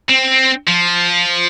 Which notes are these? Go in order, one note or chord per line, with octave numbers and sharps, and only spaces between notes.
C4
F3